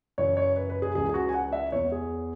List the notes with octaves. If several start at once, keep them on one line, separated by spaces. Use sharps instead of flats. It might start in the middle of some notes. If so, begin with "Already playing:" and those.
F#2 C#3 E3 C#5
C#5
B4
B4
G#4
C#2 C#3 E3 G#4
G#4
F#4
G#5
F#5
E5
E2 E3 C#5
G#4